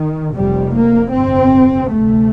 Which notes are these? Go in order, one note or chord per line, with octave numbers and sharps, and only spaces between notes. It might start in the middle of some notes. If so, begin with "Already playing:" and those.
Already playing: D#3
F1 F2 C3 G3
A#3
G1 F2 C3 C4
D2 C3 A3